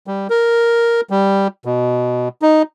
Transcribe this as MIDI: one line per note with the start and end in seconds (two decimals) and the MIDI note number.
0.07 0.27 55
0.30 1.01 70
1.10 1.48 55
1.65 2.29 47
2.42 2.63 63